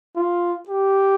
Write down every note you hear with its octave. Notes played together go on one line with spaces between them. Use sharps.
F4
G4